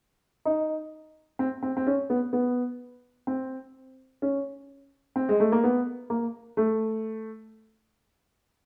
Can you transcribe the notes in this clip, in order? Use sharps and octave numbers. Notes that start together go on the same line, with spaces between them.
D#4
C4
C4
C4
C#4
B3
B3
C4
C#4
C4
G#3
A3
A#3
B3
A#3
A3